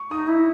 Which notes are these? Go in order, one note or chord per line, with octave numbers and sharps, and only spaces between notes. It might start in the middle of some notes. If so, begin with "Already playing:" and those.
Already playing: C#6
D#4 D#6
E4